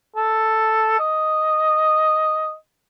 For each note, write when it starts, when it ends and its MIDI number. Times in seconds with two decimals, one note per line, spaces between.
0.16 0.99 69
0.99 2.54 75